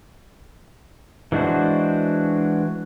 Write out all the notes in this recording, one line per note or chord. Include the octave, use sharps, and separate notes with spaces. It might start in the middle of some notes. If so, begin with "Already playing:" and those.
E3 G#3 D4 F#4 C5